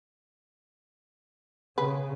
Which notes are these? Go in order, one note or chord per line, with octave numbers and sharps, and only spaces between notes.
C#3 G#4 B4